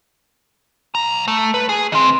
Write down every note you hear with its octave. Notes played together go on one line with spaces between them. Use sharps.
B1 A#5
A3
B4
G#4
D#3 C4